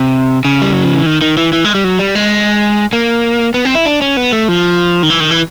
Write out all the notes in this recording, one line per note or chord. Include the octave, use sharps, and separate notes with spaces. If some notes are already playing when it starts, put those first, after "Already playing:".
Already playing: C3
C#3
G3
F#3
F3
E3
D#3
D#3
E3
E3
G#3
G3
F#3
G3
G#3
A#3
B3
C4
E4
D4
C#4
B3
A3
F3
D#3
E3
D#3
E3